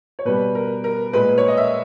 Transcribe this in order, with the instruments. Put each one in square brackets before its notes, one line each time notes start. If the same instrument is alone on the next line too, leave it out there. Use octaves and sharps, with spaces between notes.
[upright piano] C#5
B2 G3 B4
A#4
A#4
A#2 G#3 B4
B4
C#5
D#5
E5